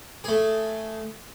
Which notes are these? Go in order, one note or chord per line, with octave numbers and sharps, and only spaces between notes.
A3 G#4